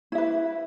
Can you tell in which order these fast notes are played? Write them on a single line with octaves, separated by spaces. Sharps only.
E4 E5 B4